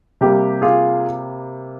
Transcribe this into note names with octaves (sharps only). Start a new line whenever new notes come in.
C3 G3 A#3 G4
F4 G#4